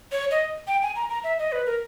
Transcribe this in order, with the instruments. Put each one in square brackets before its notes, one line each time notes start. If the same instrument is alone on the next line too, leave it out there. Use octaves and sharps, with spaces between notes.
[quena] C#5
D#5
G5
G#5
A#5
A#5
E5
D#5
B4
A#4